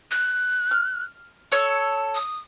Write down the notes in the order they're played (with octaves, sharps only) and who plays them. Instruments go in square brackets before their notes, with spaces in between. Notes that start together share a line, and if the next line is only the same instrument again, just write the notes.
[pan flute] F#6
[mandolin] F6
[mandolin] A4 C#5 [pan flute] E6
[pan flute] D#6